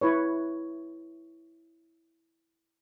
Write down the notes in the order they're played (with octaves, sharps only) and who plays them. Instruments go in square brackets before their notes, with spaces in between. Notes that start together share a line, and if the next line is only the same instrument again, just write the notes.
[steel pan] E4 B4 C#5